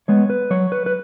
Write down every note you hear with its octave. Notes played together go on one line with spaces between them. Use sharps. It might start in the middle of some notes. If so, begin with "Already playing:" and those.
G#3 B3 C#5
B4
F#3 C#5
B4
B4